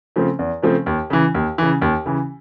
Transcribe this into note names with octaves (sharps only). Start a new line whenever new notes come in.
C#3 F3 A3 C4
E2
C#3 F3 A3 C4
D#2
C#3 E3
D#2
C#3 E3
D#2
C#3 E3